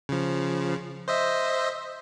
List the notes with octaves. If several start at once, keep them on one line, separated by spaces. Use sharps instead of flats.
C#3 F3
C5 D#5 E5